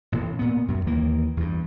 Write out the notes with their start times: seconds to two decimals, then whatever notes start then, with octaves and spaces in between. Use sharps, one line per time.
0.12 A1 A2
0.39 A#2 B3
0.68 F#2
0.87 D#2 D#3 E3 A#3
1.37 E2 G2